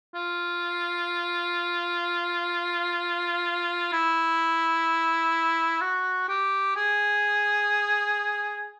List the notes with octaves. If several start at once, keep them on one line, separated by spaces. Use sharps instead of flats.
F4
E4
F#4
G4
G#4